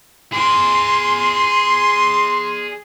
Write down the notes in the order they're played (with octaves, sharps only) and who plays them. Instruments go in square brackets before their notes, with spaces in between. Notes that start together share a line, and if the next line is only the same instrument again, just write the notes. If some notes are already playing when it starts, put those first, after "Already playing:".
[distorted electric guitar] G#4 D5 [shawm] C6